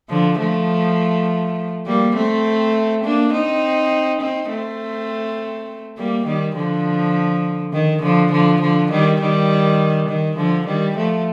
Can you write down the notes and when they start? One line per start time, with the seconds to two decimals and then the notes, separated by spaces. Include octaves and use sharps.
0.09 D3 F3
0.39 F3 A3
1.85 G3 A#3
2.15 A3 C4
3.04 A#3 D4
3.32 C4 D#4
4.21 C4 D#4
4.50 A3 C4
5.97 G3 A#3
6.26 D#3 G3
6.55 D3 F3
7.73 D#3
8.02 D3 F3
8.31 D3 F3
8.61 D3 F3
8.91 D#3 G3
9.20 D#3 G3
10.08 D#3
10.37 D3 F3
10.66 D#3 G3
10.96 F3 A3